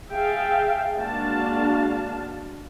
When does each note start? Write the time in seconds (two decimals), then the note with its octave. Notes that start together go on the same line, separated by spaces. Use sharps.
0.13 G#4 E5 F5 G5 A5
0.95 G#3 A#3 D4 F#4 F5 A5